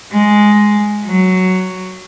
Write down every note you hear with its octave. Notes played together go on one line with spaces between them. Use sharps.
G#3
F#3